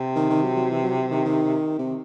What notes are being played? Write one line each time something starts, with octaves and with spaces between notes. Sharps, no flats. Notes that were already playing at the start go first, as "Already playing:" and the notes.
Already playing: C3
D#3
D#3
F#3
F#3
E3
F#3
D#3
D#3
C3